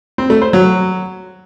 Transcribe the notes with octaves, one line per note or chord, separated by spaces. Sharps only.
C4
A3
C5
F#3